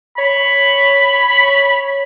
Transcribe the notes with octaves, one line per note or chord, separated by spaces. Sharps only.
C#5 B5